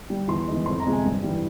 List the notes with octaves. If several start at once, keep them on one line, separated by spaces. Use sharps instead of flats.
G3
E2 C6
E3 G#3
F2 C6
A#5
C3 F3 G#3
G#5
G2
E3 G3